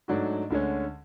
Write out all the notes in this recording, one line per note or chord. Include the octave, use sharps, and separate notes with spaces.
G#2 F#3 A3 D4 F#4
D2 D3 G#3 C#4